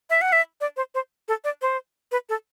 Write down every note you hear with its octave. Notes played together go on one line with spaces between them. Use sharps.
E5
F#5
E5
D5
C5
C5
A4
D5
C5
B4
A4